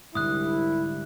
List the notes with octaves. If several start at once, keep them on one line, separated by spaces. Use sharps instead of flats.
C2 G#2 D3 G3 E4 D#6 F#6